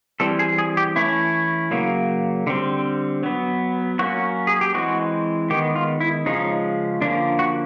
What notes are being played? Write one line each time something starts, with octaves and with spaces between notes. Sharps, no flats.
E3 G3 C4 A4
G#4
G#4
G4
E3 A3 C#4 E4
C#3 F#3 A#3
D3 G3 C4
F#3 B3
F#3 A#3 C#4 F#4
G#4
G4
E3 G#3 C4 F#4
D#3 G#3 B3 G4
F4
E4
C#3 F3 G#3 C#4 D#4
D3 F3 A#3 C#4 D4
F#4